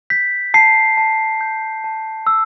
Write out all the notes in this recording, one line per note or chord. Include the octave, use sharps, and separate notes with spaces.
G6 B6
A5 C7
A5
G6
A5
E6